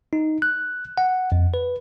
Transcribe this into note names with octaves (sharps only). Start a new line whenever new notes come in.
D#4
F#6
F#5
F2
B4